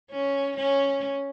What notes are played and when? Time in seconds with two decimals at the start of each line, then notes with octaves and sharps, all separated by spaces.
0.11 C#4
0.57 C#4